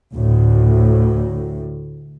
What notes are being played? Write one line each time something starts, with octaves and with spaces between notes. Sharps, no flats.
D2 A2